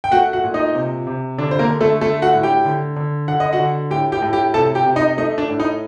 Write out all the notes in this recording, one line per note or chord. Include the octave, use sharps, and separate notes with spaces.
G5
A3 F#4 F#5
F#4 F#5
A#2
D#4 D#5
C3
C3
D3 D4 D5
C5
A#3 A#4
D3
A3 A4
A3 A4
F#4 F#5
A2
G4 G5
D3
D3
D3 F#5
D#5
F#4 F#5
D3
A2 G4 G5
G4 G5
A2
G4 G5
C3 A4 A5
G4 G5
C3
D#4 D#5
A3 D#4 D#5
D4 D5
A2
D#4 D#5